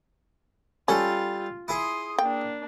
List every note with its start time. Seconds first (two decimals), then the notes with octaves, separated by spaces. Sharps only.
0.88 G3 C#4 F4 A4
1.68 E4 G#4 C6 D#6
2.19 A#3 D4 G5